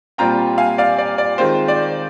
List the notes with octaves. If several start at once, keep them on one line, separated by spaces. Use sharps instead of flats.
A#2 G3 C4 F4 G5 A#5
F5 G#5
D5 F5
D5
D5
D#3 G#3 C4 F4 C5
D5